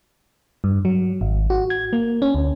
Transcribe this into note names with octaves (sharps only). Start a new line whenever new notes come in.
G2
F#3
G#1
F#4
G#6
A#3
C#4
D2